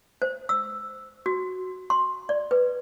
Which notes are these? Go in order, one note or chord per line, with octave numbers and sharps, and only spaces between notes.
C5
E6
F#4
C6
D5
B4